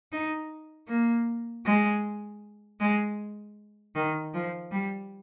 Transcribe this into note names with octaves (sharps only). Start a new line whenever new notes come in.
D#4
A#3
G#3
G#3
D#3
F3
G3